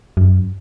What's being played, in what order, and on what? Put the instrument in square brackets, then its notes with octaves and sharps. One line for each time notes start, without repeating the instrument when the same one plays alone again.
[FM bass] F#2